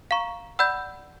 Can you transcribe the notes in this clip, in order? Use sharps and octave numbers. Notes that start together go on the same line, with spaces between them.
F5 A#5 C#6
D5 F#5 B5 E6 G6